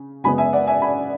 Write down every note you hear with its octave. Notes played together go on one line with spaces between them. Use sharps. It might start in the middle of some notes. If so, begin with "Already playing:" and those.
Already playing: C#3
F#2 C#3 G#3 B3 G#5 B5
E5 G#5
D5 F#5
E5 G#5
G#5 B5